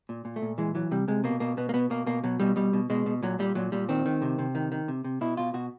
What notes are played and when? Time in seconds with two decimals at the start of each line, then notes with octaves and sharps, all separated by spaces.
0.09 A#2
0.25 A#2
0.36 A3
0.42 A#2
0.58 E3 G#3
0.75 E3 F#3
0.91 C3 G3
1.08 C3 G#3
1.24 B2 A#3
1.40 B2 A#3
1.57 B2 B3
1.69 A#3
1.74 B2 B3
1.90 B2 A#3
2.06 B2 A#3
2.24 B2 F#3
2.40 B2 G3
2.56 B2 G3
2.73 B2
2.90 B2 G#3
3.06 B2
3.23 A#2 F#3
3.39 A#2 G3
3.55 A#2 F#3
3.72 A#2 G3
3.89 D#3 C4
4.06 D#3
4.22 C3
4.39 C3
4.55 D#3
4.72 D#3
4.88 C3
5.04 C3
5.21 B2 E4
5.37 B2 F4
5.54 B2 F#4